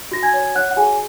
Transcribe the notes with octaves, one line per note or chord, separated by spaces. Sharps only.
F#4 A#6
G#5 G#6
C#5
C#5 F#5 F#6
F#5
F#4 G#4 G#5